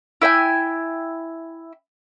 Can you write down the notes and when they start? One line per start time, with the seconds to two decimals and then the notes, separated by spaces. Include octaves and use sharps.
0.21 E4 E5 G5 G#5